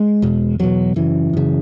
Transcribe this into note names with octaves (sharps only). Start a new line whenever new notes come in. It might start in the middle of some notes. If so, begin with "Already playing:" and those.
Already playing: G#3
E2 B2
E2 B2 F#3
F#2 C#3 E3
F#2 C#3